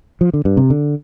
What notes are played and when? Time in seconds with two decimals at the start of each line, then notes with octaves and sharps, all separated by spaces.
0.21 F3
0.34 D3
0.45 G2
0.57 C3
0.70 D3